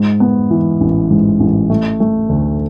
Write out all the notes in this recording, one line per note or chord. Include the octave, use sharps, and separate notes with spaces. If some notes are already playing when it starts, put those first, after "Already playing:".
Already playing: G#2
B3
E3
A1
G#2
A1
A3
A3
D2